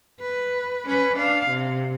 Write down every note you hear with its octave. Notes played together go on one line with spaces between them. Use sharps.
B4
C#4 B4
D4 F5
C3